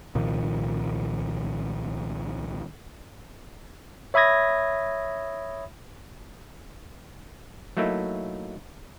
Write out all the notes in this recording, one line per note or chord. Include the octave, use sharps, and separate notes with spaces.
C2 A#2 D#3 F3
C#5 E5 B5 D#6 G#6 A#6
F#3 A3 A#3 D#4 E4